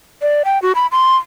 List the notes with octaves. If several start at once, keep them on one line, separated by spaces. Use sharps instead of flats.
D5
G5
F#4
B5
C6